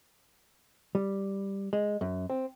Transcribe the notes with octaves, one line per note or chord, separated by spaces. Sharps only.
G3
G#3
F#2
C4